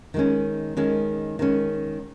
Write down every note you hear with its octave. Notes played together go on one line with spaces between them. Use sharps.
D#3 G#3 C#4
D#3 G#3 C#4
D#3 G#3 C#4